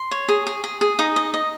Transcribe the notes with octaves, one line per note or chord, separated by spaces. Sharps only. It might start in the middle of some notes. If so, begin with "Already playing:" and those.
Already playing: C6
C#5
G#4
G#4
G#4
G#4
D#4 D#6
D#5
D#5